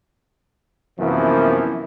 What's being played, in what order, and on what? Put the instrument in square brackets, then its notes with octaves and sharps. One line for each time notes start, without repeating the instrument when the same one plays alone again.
[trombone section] F#2 C3 E3 F3 A#3 B3